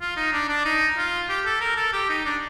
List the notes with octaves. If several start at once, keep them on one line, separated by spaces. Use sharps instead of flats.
F4
D#4
D4
D4
D#4
F4
G4
A4
A#4
A4
G4
D#4
D4